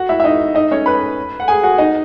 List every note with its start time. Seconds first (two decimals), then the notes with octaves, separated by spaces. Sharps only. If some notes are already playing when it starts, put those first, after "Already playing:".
Already playing: F#4 F#5
0.09 E4 E5
0.20 E5
0.24 D#4 D#5
0.55 D#4 D#5
0.71 C#4 C#5
0.86 B4 B5
1.40 F#5
1.48 G#4 G#5
1.63 F#4 F#5
1.78 D#4 D#5